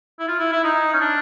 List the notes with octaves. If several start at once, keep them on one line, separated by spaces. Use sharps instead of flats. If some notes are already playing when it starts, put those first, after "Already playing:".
E4
F4
E4
E4
D#4
C#4
D4